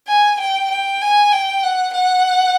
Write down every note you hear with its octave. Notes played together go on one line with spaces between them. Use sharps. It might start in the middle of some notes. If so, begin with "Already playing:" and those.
G#5
G5
G5
G#5
G5
F#5
F#5